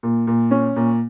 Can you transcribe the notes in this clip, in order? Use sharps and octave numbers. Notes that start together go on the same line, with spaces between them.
A#2
A#2
C#4
A#2